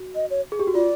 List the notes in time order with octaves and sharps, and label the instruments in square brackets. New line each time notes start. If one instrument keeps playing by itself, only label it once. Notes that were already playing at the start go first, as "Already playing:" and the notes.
Already playing: [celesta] F#4
[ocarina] D#5
C#5
[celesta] G#4
G4
F#4
[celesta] F4 [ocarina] D5